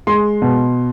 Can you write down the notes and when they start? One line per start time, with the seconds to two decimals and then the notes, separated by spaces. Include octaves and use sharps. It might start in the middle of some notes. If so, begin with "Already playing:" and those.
0.07 G#3 C6
0.42 B2